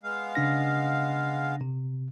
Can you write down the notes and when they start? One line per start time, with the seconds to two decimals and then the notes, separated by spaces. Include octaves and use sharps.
0.03 G#3 B3 F5
0.35 C#3 D4 A#6
1.61 C3